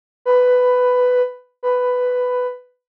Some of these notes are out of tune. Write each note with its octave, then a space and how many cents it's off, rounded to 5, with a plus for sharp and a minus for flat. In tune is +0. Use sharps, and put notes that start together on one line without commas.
B4 +10
B4 +10